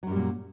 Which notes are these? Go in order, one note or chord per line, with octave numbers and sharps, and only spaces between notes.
F#2 A#2 F#3 G3